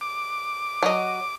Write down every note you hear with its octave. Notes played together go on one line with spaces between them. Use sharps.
D6
F#3 D#5